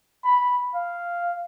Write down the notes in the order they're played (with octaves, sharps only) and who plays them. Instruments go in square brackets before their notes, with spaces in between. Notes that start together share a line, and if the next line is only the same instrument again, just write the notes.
[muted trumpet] B5
F5